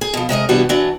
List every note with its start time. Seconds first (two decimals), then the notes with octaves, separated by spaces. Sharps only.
0.01 G#4
0.14 B2 F3
0.29 C3 G#3 A#4 D#5
0.49 C3 E3 G3 B3 D4 F#4
0.69 E3 F#3 D4